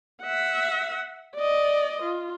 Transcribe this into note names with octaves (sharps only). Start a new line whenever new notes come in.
E5 F#5
D5 D#5
F4